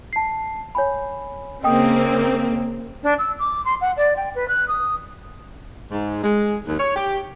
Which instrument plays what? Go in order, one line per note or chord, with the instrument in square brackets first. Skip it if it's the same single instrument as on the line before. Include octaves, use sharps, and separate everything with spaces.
[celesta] A5 C7
C#5 G#5 B5
[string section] C#3 A#3 C4 [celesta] D#5 G5 D#6
[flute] D4
E6
D6
C6
F#5
D5
G5
B4
F#6
D#6
[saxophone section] G#2
G#3
D#2
C#5
G4